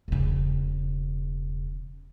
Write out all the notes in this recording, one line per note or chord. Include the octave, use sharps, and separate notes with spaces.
E1 C#3